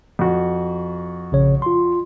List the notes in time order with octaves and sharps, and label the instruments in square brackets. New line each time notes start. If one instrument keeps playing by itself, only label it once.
[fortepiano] F2 F#4
[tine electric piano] A#1 C#3 C#5
F4 C6